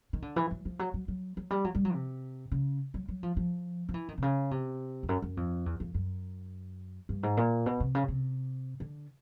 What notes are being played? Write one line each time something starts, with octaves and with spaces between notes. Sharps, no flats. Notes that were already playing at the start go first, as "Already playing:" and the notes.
D#3
D3
E3
F#3
F3
F#3
F#3
F#3
F#3
G3
F#3
G3
F#3
C3
C#3
F#3
F#3
F3
F3
F3
E3
D#3
C3
C#3
C3
F2
F#2
F#2
F2
E2
F2
F#2
G2
G#2
A#2
B2
C3
C#3
C3
D3